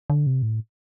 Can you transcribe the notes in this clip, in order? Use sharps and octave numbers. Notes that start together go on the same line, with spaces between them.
D3
C3
A2